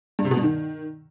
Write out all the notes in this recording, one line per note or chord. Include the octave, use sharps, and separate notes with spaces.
G2
C3
B2
G2
D#3